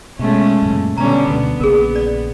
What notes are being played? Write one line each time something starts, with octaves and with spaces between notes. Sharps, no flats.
B2 G#3 A3 C#4
F#2 A#2 C#3
B2 D3 G3 B3 C#4 A#5
D2 B2 B3
A#1 C#3 A#3 G#4 A#4
D5